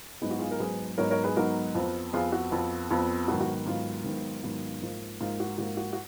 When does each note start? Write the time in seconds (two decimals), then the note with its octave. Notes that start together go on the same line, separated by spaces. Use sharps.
0.21 G#2 F#3 B3 D#4 G#4
0.31 F#4
0.39 F4 G#4
0.51 A#4
0.60 G#2 F#3 B3 D#4 G#4 B4
0.98 G#2 F#3 B3 D#4 A#4 C#5
1.11 A#4 C#5
1.24 G#4 B4
1.37 G#2 F#3 B3 D#4 F#4 A#4
1.75 F2 F3 B3
2.13 F2 F3 B3 F4 G#4
2.32 F#4
2.51 F2 F3 B3
2.90 F2 F3 B3
3.28 G#2 D#3 F#3 B3 F#4
3.41 F#4
3.66 G#2 D#3 F#3 B3 F4
4.04 G#2 D#3 F#3 B3
4.43 G#2 D#3 F#3 B3
4.82 G#2 F3 A#3
5.21 G#2 F3 A#3 F4
5.40 F#4
5.58 G#2 F3 A#3 F#4
5.77 F#4
5.93 F#4